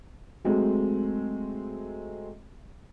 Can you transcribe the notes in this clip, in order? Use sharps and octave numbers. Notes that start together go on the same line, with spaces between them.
F#3 G#3 A3 C4